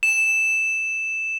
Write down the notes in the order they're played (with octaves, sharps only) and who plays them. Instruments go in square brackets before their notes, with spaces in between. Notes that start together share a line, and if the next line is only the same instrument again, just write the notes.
[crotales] E7